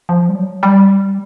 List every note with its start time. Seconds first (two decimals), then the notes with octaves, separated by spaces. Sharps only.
0.09 F3
0.29 G3
0.36 F#3
0.63 G3